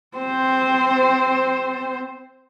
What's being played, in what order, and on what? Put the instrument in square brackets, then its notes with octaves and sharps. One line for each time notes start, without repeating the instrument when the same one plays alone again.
[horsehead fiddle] C4 C5